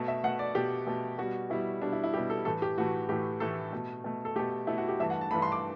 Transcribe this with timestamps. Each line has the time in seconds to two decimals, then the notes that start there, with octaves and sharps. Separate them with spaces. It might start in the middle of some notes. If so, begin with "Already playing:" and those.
Already playing: B2 A3
0.08 E5
0.24 B2 A3 F#5
0.39 D5
0.55 B2 A3 G4
0.87 B2 A3
1.18 B2 G3 F#4
1.50 B2 G3 E4
1.82 B2 G3 D4
1.93 E4
2.04 E4
2.14 B2 G3 G4
2.30 A4
2.45 A2 E3 A3 A4
2.62 G4
2.78 A2 E3 A3 F#4
3.09 A2 E3 A3 G4
3.40 A2 E3 A3 A4
3.72 B2 A3
4.04 B2 A3
4.25 A4
4.36 B2 A3 G4
4.67 B2 A3 E4
4.78 F#4
4.88 G4
4.99 G2 E3 A3 E5
5.10 F#5
5.21 A5
5.31 G2 E3 A3 B5
5.42 C6
5.52 D6